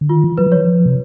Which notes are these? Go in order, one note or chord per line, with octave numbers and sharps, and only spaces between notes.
D3
D#3 F4
E3
F#3 B4
F3
E3 C#5
F3
C3